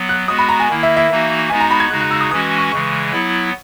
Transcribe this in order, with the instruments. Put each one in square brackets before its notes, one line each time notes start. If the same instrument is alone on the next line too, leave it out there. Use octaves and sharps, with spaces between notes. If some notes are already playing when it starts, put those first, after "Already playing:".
Already playing: [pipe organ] F#3 B3
[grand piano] F#6
[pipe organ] G#3 B3 F#4 [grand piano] D#6
[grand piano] B5
A#5
G#5
[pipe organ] D#3 A#3 E4
[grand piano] E5
E5
[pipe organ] E3 A#3 D#4 F#4
[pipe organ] G#3 B3 D#4 F#4 [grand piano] G#5
[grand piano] A#5
B5
G#6
[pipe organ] C#3 G#3 D#4 F#4 [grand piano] F#6
[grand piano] F#6
E6
D#6
[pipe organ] E3 G#3 C#4 F#4 [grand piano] D#6
[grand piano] C#6
[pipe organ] C#3 E3 G#3 [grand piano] C#6
[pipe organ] F#3 B3 E4